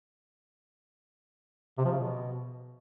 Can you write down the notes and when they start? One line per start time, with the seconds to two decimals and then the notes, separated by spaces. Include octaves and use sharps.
1.78 C3
1.85 F3
1.92 C#3
1.99 B2